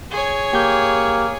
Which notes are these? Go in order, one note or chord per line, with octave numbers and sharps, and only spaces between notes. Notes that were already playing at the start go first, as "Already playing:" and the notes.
G#4 C#5
A#3 G4 G6